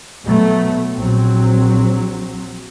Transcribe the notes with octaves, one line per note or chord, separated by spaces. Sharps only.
B2 F#3 A3 B3
A#1 F#3 C4